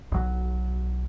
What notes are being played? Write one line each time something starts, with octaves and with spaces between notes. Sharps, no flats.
B1 F#3